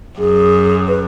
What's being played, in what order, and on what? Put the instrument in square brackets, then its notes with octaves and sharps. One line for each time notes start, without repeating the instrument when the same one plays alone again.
[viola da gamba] F#2 [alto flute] G#4
[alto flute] B4